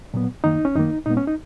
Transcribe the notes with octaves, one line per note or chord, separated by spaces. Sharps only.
A#2 F#3 B3
F#2 D#3 A#3 D#4
C#4
F#2 D#3 A#3 D#4
A#2 G#3 B3 D#4
C#4
D#4